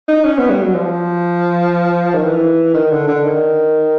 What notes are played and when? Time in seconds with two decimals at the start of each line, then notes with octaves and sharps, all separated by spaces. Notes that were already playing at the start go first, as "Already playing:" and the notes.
0.08 D#4
0.24 C#4
0.38 B3
0.49 G3
0.62 F#3
0.75 F3
2.14 D#3
2.25 E3
2.74 D#3
2.91 D3
3.08 D3
3.24 D#3